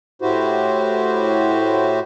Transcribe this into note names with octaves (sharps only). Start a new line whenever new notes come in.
A2 E4 F#4 G4 C5